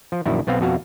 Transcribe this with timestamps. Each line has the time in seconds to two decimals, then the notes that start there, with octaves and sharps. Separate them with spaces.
0.12 F3
0.26 A#1 F#2 D#3 E4
0.47 B1 B3 C4 F5
0.60 F2 B2 F#4 F5